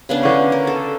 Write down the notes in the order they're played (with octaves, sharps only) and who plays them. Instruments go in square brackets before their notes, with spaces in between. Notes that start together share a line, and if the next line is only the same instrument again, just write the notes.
[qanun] C#3 B3 D4
[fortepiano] D3 C#4
[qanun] A#4
A4